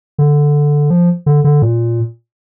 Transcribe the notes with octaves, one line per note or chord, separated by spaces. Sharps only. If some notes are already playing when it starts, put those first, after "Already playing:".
D3
F3
D3
D3
A#2